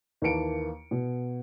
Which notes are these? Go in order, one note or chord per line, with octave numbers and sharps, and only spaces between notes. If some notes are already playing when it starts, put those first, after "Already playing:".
D#2 E3 A#3 A5 C#7 D7
B2